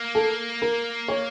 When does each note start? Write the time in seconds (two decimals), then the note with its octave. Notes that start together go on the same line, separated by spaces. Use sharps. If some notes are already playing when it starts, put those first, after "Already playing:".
Already playing: A#3
0.15 A4
0.62 A#4
1.08 C#5